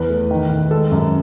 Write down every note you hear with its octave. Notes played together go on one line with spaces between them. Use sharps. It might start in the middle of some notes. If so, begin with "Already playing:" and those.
Already playing: E2 B4
A3
D#3
D#3
G#3 A4
F#2